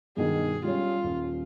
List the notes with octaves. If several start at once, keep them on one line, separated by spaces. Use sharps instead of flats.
G2 B2 D#3 G#4
G3 C#4 F4
D#1